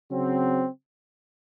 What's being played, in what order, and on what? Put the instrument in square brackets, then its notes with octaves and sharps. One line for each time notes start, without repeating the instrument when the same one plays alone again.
[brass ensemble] C#3 F#3 C4